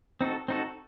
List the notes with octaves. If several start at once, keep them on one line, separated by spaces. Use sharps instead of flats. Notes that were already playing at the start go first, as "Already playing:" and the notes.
C4 D#4 F#4 A4
C4 D#4 F#4 A4